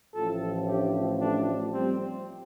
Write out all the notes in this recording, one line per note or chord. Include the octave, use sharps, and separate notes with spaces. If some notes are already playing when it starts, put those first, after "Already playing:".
A1 A2 F3 F4 A4
D4 G4
A3 D4
G3 C4